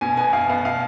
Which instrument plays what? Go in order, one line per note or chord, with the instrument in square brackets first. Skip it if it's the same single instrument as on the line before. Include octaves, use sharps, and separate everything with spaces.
[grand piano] B2 G#5
B3 G#5
B2 F5
B3 F5
B2 F5